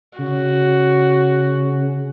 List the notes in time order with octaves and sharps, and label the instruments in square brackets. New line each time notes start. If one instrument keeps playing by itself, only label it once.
[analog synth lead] C#3 [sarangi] F#4